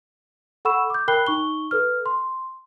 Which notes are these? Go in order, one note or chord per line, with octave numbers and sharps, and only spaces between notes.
A4 F#5 B5 C#6 E6 E7
D6 G6
A#4 G5 B5 F#6 C7 G7
D#4 C#6 G7
A4 B4 F6
C6